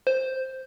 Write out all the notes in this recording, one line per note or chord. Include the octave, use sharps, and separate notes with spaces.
C5